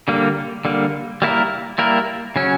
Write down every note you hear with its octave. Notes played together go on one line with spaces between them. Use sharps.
D3 G3 A#3
D3 G3 A#3
G3 A#3 E4 A#4
G3 A#3 E4 A#4
C#3 F#3 C#4